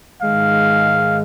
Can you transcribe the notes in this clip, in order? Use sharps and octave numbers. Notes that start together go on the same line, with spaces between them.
G#2 D#3 G#3 F5